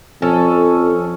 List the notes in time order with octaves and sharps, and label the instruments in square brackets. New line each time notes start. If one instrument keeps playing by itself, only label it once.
[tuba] F2 [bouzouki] C#4 A4